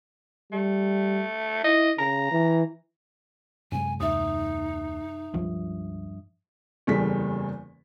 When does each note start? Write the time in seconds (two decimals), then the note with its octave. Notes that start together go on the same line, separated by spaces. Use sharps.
0.52 G3 A3
1.64 E4 D#5
1.98 C#3 A#5
2.31 E3
3.72 F#2 C3 G#3 G#5
4.00 D#2 D#4 E5 D#6
5.34 C#2 G2 F3
6.87 F#1 E2 G3 G#4 A4 B6